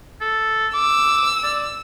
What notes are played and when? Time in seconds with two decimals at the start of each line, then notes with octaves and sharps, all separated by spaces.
0.21 A4
0.74 D6 E6
1.43 D5